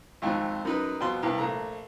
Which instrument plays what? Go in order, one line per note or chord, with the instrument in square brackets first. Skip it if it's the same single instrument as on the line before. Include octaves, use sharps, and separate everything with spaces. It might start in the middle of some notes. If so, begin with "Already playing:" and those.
[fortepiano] G#1 F2 G#2
F#2 D#4 B4
F2 B2 C6
C2 G2
A#1 A3 A#5